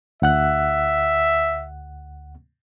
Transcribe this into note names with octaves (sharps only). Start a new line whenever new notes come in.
D2 E5 F#5 F#6